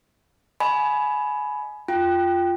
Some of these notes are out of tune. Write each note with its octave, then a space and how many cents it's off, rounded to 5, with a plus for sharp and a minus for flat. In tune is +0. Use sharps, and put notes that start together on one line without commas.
D#5 +0 G#5 +20 B5 +0
F4 +0 G5 +0